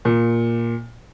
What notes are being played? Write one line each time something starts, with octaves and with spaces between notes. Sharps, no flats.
A#2